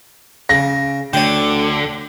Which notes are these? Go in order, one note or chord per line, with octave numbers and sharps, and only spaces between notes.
C#3 A#6
D2 D3 C#5 G5